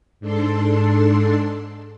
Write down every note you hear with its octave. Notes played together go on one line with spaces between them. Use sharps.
G#2 D4 A4 C6